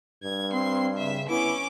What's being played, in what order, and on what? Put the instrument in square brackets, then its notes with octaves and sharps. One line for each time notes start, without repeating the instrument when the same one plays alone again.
[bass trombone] G2 [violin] G#6
[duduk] C4 [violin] C6
[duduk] C#3 [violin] E5
[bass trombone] B3 [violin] C#4 D6 [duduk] E4